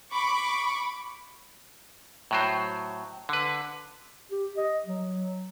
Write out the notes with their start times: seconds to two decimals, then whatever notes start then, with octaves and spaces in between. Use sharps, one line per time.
0.11 B5 C#6 D6
2.31 A2 F#3 C5
3.29 D3 B4
4.31 G4
4.57 D#5
4.86 F#3